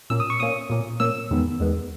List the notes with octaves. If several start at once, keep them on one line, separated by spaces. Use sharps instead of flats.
A#2 A#3 C#4 E6
D#6
C#6
A#2 A#3 C#4 D#6
A#2 A#3 C#4
A#2 A#3 C#4 E6
E2 D#3 G#3 B3
E2 D#3 G#3 B3